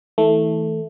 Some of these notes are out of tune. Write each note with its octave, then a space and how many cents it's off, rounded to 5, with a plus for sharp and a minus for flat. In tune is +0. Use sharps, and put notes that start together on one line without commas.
E3 -40 A3 +0